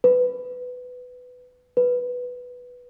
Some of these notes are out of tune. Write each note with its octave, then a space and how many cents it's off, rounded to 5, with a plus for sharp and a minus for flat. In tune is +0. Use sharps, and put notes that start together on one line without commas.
B4 +15
B4 +0